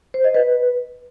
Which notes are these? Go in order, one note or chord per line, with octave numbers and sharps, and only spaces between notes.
C5
D#5
B4